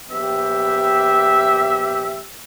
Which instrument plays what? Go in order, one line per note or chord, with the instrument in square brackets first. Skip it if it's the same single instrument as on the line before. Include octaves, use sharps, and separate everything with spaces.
[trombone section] A#1 B3 G4 [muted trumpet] E5